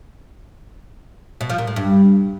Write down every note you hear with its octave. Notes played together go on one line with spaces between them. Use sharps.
B2
F3
A#2
A2
G2